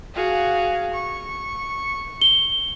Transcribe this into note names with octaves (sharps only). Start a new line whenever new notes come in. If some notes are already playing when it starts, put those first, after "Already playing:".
F#4 G#4 F5
C#6
G7